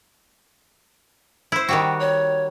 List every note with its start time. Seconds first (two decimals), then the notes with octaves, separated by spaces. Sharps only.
1.52 E4 C5
1.69 D#3 G3 F#4 G5
2.00 C#5